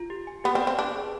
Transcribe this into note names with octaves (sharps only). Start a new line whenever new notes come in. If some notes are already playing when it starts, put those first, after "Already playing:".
Already playing: F4
G4
G#5
B3 G4
C4
D5
C4
D4 B4
G#4